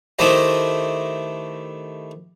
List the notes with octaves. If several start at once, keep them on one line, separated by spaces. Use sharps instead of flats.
D#3 A3 E4 G4 C5 D#5